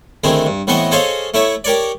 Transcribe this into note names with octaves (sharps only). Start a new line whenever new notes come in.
D2 D3 D#3 C4 E4 G#4
G2
A2 E3 B3 C4 D#5 C#6
G#4 A4 C5 C#5 D#5 F5
A3 E4 C#5 E5
G4 A#4 C#5 D5